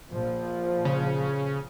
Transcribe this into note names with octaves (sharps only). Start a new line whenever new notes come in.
A#1 F3
C#3